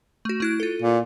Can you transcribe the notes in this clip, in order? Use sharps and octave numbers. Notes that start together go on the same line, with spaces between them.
A3 F#4
A3 E4 F#6
F4 A4
A#2